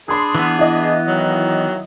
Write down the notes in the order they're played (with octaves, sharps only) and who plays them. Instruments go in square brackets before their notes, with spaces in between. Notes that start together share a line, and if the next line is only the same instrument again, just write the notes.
[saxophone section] D4 G#4 [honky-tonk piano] B5 C6 D#6
[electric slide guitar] E3 B3
[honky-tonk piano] E4 D#5
[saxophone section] D#3 F#3